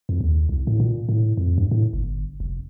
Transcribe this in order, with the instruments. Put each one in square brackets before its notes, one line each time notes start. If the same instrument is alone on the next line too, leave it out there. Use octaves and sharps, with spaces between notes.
[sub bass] F2
D#2
C2
A2
A#2
A2
F2
G2
A2
G1
F1